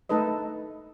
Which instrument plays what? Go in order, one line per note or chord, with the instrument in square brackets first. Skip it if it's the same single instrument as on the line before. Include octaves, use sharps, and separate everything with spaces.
[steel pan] A3 D#4 A4 B4 D#5